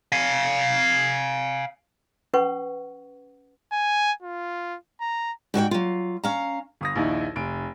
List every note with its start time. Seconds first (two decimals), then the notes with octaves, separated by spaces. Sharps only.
0.12 F5 G#5
2.34 C#4 B4 F#5 C#6
3.72 G#5
4.23 F4
5.01 A#5
5.54 G#2 F#4 C5 G5
5.71 F#3 F4
6.23 C#4 F5 A#5
6.81 G1 D#6 A#6
6.96 A#1 D#2 D#4 E4
7.36 F1 D7